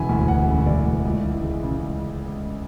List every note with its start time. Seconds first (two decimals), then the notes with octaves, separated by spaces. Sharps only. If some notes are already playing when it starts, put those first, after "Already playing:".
Already playing: E1 C#3 E3 G#5 B5
0.09 D2
0.28 E1 F#5
0.47 C#3
0.66 E3 D5
0.86 D2
1.05 C#2
1.24 E3
1.43 G#3
1.63 C#3